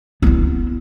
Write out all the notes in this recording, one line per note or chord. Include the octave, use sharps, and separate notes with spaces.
B3 E4